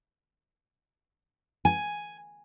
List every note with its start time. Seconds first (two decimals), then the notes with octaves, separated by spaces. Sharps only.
1.65 G#5